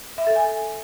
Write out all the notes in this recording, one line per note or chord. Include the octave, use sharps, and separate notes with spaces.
E5
A4
G#5